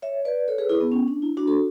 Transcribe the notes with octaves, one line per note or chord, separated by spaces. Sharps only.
C#5 E5
B4 D5
A4 C#5
G#4 B4
E4 G#4
B3
C#4
D4
E4
D4 F#4
F#4 A4